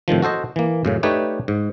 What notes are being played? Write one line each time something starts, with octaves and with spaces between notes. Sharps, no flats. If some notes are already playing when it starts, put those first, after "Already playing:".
A2 C3 D#3 F3
F#4 A4 C5 D#5
E3 A#3
F#2 A2 C#3
A3 D#4 G4 B4 C#5 D5
G#2